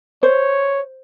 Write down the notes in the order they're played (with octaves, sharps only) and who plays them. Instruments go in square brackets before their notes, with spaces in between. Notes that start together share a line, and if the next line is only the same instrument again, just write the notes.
[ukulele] C5 [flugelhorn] C#5